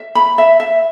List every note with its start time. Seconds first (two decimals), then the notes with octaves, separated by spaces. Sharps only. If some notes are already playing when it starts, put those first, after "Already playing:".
Already playing: E5
0.15 B5
0.38 E5
0.60 E5